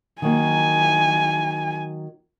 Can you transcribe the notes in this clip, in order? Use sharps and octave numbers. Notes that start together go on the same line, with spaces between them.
D#3 F#3 A#3 G#5